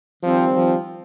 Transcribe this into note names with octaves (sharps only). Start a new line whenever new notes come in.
D#3 F3 G3 C4
F3